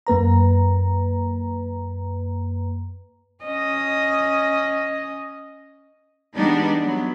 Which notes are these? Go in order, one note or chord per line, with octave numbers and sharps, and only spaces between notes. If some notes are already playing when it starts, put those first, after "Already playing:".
F#2 A#3 B4 A#5
C#4 D#5
E3 G3 G#3 B3 D4 D#4
F#3 B3